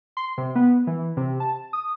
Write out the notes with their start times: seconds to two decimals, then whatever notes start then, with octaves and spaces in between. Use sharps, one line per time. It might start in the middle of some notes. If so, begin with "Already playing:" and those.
0.17 C6
0.38 C3
0.55 B3
0.87 E3
1.17 C3
1.40 A5
1.73 D#6